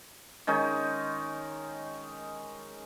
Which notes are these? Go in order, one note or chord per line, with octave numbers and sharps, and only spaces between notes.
D#3 G#3 C#4 D#4